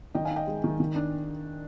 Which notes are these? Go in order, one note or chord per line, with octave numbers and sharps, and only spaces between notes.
D#3 D#5 G5
F5 G#5
D#4
D#5 G5
G#3
D#3
D#3
D4